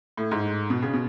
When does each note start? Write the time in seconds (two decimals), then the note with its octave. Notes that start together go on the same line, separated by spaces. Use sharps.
0.17 A2
0.31 G#2
0.70 B2
0.82 C#3
0.93 B2